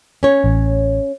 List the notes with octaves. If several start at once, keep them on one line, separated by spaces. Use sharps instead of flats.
C#4 C#5
A1